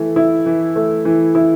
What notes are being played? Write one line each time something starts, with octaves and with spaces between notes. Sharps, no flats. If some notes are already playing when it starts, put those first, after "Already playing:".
Already playing: E3 A3
E4
E3
A3
E3
E4